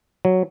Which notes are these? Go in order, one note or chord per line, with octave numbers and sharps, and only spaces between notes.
F#3